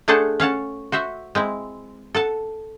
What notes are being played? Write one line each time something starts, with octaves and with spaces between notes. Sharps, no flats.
A3 D4 G#4 A4 C5 F#5
C#4 F5 F#5 A5
F#4 C5 E5 F#5
G#3 C4 E4
A4 F#5 A5